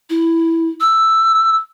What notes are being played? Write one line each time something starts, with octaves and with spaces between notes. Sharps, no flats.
E4
E6